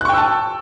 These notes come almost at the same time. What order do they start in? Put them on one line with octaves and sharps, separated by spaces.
F#6 C#6 G5 E6 A5